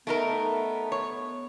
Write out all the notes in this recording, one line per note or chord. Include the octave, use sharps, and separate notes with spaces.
A3 B3 D#4 A#4
C#5